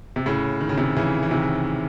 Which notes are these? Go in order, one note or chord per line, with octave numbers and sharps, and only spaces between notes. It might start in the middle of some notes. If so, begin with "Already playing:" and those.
C3
A2 C#3
D#3
C#3
C3 D#3
C#3 E3
E3
C3 D#3